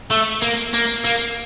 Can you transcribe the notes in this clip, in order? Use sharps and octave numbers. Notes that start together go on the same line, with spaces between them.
A3
A#3
A#3
A#3